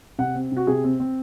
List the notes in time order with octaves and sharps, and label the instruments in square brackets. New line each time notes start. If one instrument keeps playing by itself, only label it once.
[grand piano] C3 F#5
C4
C3 F#4
C3 G#4
C4
C4